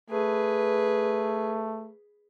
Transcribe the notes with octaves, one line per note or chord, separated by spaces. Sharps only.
A3 G#4 B4